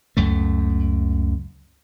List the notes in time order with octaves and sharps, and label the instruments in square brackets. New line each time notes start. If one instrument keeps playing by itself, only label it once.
[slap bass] C#2 F#2 A3